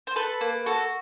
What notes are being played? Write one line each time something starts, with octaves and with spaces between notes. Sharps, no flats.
C5
A4 B4
A#3
F#4 A4